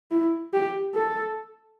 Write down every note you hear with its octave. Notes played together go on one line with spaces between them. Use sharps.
E4
G4
A4